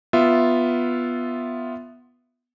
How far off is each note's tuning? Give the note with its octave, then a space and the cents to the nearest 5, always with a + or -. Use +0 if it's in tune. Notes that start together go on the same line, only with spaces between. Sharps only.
B3 +0 F4 +0 E5 +0